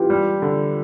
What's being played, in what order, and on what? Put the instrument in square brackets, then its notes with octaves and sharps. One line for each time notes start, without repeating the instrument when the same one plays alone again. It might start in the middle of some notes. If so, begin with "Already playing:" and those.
Already playing: [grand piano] E3 [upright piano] F4 G4
[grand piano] G3
D3